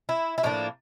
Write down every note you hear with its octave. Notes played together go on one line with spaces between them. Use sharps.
E4
E4
A2 F3 A#3 D4 D#4